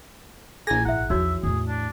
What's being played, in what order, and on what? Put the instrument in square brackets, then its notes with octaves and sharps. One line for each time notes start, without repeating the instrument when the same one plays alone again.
[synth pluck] A#1 A#6 [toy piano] E4 G#4 [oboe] G#5
[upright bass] G#1 [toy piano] E4 E5 [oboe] F#5
[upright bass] E2 F3 [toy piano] D#4 F#4 C#5 [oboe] E5
[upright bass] E2 A2 [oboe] G#4
[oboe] D4